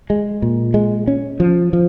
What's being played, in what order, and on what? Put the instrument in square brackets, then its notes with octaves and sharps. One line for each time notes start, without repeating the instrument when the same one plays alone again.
[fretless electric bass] G#3
A#2
G#3
C#4
F3
F3